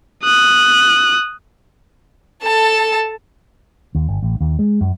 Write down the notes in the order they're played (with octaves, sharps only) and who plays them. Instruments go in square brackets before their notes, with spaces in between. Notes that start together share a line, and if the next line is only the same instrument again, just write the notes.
[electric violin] D#6 F#6
[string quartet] A4 A5
[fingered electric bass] D#2
G1
A1
D#2
G#3
F#2